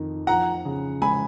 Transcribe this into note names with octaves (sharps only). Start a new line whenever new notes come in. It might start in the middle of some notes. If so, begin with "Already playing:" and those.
Already playing: F2 D#3
F3 F#5 A#5
C#3
G#3 G#5 B5